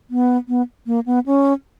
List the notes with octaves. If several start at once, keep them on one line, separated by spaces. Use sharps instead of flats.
B3
B3
A#3
B3
C#4